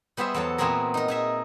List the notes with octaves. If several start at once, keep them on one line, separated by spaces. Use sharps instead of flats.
G3 B3 G#4 C5 E5
E2 F#3 A4 C#5
A#2 E3 B3 C4 G#4 A#4
D#4 A#4
D#4 G#4 E5